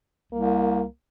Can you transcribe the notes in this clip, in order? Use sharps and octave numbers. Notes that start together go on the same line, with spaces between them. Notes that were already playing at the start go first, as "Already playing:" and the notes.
C2 A#3